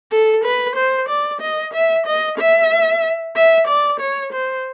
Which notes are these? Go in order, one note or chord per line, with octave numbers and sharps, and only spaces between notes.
A4
B4
C5
D5
D#5
E5
D#5
E5
E5
D5
C#5
C5